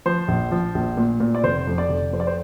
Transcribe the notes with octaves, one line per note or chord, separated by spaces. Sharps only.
F3 C5
A#1
F3
A#1
A#2
A#2
D5
F1 C5
F2
D5
F1
F2 C5
D5
C5